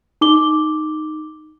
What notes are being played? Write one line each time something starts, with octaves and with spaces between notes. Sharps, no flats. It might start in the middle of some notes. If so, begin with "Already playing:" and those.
D#4 D6 G7